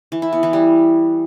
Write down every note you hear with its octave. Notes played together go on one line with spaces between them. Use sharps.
E3
E4
B3
E3
G3